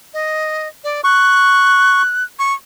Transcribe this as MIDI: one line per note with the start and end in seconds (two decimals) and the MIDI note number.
0.14 0.68 75
0.84 1.01 74
1.04 2.02 85
1.04 2.24 90
2.39 2.54 85